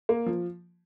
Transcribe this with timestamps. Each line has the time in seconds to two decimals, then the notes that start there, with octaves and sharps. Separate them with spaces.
0.09 A#3
0.26 F3